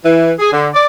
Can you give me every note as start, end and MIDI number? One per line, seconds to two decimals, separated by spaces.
0.04 0.32 52
0.39 0.48 68
0.52 0.67 50
0.73 0.86 74